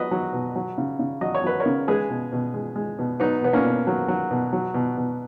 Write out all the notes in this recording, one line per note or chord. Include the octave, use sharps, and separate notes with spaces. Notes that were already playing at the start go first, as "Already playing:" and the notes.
Already playing: F#3 B4 D#5
F#3
B2
F#3
C#3
C#3
F#3 D#5
C#5
F#3 B4
A#4 C#5
C#3
G#3 G#4 B4
B2
B2
G#3
G#3
B2
F#3 B3 D#4
B2 B3
A#3 C#4
B2
F#3
F#3
B2
F#3
B2
B2